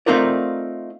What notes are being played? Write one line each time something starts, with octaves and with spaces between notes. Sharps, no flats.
A3 C4 D#4 F4 A#4 D5